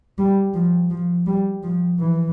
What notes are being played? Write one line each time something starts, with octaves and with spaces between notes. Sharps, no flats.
G3
F3
F3
G3
F3
E3